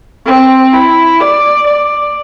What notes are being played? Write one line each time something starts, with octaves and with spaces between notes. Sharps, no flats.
C4
E4
D5
D5